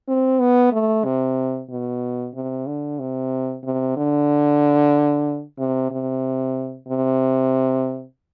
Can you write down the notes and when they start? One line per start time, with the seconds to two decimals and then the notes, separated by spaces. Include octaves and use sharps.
0.08 C4
0.40 B3
0.72 A3
1.04 C3
1.70 B2
2.34 C3
2.67 D3
2.99 C3
3.64 C3
3.97 D3
5.58 C3
5.91 C3
6.88 C3